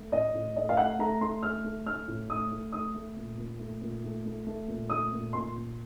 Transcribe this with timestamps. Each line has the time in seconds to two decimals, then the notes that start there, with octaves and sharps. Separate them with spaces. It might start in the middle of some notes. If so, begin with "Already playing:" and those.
Already playing: A3
0.12 A2 D#5
0.34 A2
0.56 A3 D#5
0.69 F5
0.77 A3 F#5
0.99 A3 A#5
1.21 A3 C6
1.43 A3 F6
1.64 A3
1.86 A3 F6
2.08 A2
2.30 A3 D#6
2.51 A3
2.72 A3 D#6
2.94 A3
3.16 A#2
3.38 A#2
3.59 A3
3.81 A#2
4.04 A3
4.25 A3
4.47 A3
4.68 A#2
4.90 A3 D#6
5.12 A#2
5.33 A#2 C6
5.56 A#2